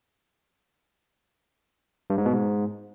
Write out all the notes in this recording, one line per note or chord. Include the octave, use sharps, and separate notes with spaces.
G2
G#2
B2
G#2